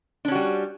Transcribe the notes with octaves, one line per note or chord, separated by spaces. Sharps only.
G3 C#4 D4 F#4